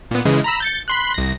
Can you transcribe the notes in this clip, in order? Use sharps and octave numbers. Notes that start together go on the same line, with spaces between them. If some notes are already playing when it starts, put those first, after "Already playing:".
A#2 B3
C#3 E3 G#3
A#5 B5 E6
G6 A6 C#7
B5 C6 F#6
C2 A#6